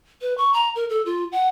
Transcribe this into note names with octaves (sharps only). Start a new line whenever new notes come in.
B4
C#6
A#5
A#4
A4
F4
F#5